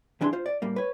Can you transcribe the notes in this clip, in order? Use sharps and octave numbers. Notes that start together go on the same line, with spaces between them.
B1 E3 D4 G#4 B5 C6
F4 C5
D5
A2 G3 A#3
B4 C#5